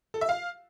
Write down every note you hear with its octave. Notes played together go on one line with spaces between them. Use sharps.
A4
E5
F5